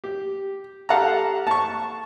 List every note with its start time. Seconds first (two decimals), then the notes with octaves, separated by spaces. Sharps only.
0.04 G4
0.89 G4 A4 F5 F#5 A5 A#5
1.47 A5 C#6